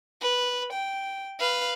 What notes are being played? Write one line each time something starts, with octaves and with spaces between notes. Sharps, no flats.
B4
G5
B4 F5